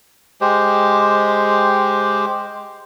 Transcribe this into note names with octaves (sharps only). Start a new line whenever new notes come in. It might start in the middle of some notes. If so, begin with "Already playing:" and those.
G#3 G4 C5